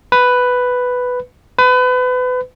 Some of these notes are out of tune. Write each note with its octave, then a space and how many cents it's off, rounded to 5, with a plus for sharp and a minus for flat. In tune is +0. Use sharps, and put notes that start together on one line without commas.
B4 +5
B4 +30